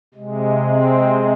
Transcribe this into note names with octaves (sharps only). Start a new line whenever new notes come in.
C3 G#3
C4